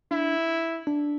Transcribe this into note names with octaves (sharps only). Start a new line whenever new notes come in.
D4 E4
D4